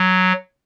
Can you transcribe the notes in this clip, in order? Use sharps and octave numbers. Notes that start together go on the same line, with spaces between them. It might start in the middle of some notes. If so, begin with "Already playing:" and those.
Already playing: F#3